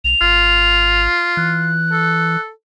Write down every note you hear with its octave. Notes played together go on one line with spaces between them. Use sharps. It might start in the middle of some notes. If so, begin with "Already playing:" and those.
B1 F7
G#1 F4
E3 F#6
A4